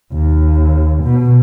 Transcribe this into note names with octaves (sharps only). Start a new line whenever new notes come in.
D#2
B2